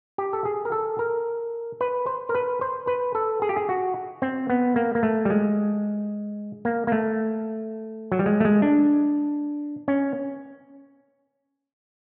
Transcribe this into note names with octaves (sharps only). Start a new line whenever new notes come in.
G4
A4
G#4
A#4
A4
A#4
B4
C5
A#4
B4
C5
B4
A4
G#4
G4
G#4
F#4
C4
B3
A#3
A#3
A3
G3
G#3
A#3
A#3
A3
F#3
G3
G#3
A3
G#3
D4
C#4